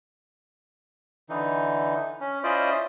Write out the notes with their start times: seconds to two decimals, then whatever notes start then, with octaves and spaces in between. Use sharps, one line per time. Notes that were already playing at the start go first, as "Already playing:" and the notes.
1.30 D3 E3 D#4
2.20 C#4
2.44 C#4 E4 F4 C5 D5 D#5